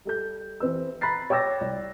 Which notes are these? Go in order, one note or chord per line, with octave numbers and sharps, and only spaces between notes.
G3 A4 G6
E3 C4 B4 E6
A#5 B5 F#6 A6 C7
C#5 G5 D6 E6 A6 A#6
C2 D5